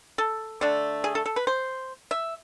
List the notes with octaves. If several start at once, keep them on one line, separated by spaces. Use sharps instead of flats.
A4
D3 A3 D4
G#4
A4
A4
B4
C5
E5